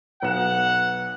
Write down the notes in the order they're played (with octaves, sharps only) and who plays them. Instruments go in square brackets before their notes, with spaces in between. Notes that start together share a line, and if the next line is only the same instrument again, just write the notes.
[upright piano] B1 B3 E7 [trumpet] F#5